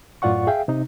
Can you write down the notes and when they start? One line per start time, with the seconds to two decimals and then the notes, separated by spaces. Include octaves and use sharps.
0.22 F#2 A2 F4 D5 F#5 C#6
0.47 G#4 E5 F5 G5
0.68 C3 D#4